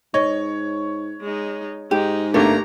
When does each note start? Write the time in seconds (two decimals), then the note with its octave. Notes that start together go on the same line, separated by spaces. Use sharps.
0.14 G#2 C#5 D#5
1.21 G#3 D#4
1.91 G#2 G#3 D#4 G4
2.34 G1 A3 A#3 D4 G4 A#5